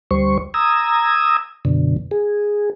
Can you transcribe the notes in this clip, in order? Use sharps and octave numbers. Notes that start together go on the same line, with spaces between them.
D2 G3 C5 C#6
A#5 D#6 E6 G#6
F#2 B2 D3
G#4